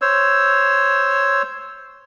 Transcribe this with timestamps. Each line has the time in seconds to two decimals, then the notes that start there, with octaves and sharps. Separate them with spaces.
0.02 C5 C#5 E6